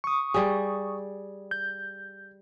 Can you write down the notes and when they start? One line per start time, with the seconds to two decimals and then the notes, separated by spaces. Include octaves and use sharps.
0.04 C#6 D#6
0.34 G3 G#4
1.51 G6